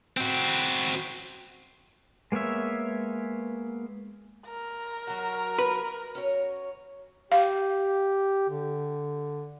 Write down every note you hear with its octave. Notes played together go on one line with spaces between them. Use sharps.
C4 F#4
G#3 A#3 B3 C#5 E5
A#4
F#3 F#4
B4
C#4 F#4 C#5
G4 F5
D3